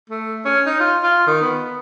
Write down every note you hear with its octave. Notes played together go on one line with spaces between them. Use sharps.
A3
C#4
D#4
F4
F4
D#3
B3